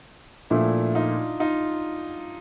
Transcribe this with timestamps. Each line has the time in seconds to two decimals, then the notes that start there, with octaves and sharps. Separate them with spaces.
0.50 A#2 F3 A3 D4 E4
0.95 D#4 F4
1.40 D#4 F4